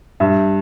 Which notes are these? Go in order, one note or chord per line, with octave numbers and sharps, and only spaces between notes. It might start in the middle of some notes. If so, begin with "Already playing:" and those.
G2 E5